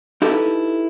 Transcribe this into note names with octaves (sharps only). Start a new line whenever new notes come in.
D#4 E4 G4 A4 B4